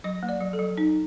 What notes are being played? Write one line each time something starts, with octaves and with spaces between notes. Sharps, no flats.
F#3 D#5
A#3
D5
F#3
A4
F#3
D#4